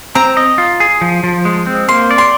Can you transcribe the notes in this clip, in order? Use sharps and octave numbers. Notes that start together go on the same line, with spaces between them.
C4 A#5
D#5
F4
G#4
F3
F3
G#3
C4
A#3 C6
D5
C6